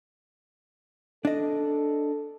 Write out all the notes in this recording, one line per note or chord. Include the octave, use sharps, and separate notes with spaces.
D4 A4 D#5